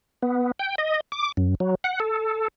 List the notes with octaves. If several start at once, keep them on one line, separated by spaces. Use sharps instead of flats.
B3
G5
D#5
D6
F#2
F#3
F#5
A4